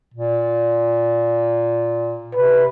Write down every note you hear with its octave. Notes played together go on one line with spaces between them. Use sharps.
A#2
C3 B4